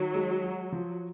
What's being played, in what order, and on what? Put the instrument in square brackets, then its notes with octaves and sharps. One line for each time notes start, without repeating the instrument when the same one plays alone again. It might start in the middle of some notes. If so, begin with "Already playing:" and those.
Already playing: [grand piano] D#3 [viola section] F#3
[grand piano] G#3
F#4
F3